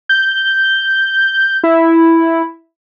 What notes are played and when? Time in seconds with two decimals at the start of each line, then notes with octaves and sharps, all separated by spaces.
0.09 G6
1.63 E4